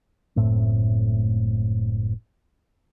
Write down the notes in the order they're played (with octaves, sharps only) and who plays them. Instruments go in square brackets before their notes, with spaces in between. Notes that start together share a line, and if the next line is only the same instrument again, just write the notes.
[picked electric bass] F#1 A2 A3 C4